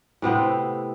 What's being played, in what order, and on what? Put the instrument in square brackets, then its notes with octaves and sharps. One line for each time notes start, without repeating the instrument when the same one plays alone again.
[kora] A2 C3 B3 C4